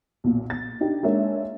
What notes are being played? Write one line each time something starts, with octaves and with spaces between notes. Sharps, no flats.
B1 A#2
A6
D4 D#4 G4
G#3 A#3 D4 C#5 E5